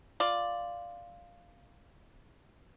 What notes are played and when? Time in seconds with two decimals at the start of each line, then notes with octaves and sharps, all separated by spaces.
0.20 F4 D5